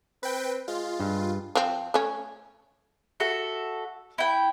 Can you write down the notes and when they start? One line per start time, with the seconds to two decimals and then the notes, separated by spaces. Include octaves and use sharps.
0.23 C4 B4 G5
0.68 G#3 F4
1.00 G2
1.55 F3 C4
1.94 A3 C#4
3.20 F#4 A4 E5
4.18 E4 G5